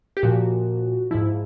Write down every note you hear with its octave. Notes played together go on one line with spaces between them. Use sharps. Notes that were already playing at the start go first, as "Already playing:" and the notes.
G4
A#2 F3 F#4
G#2 F3 E4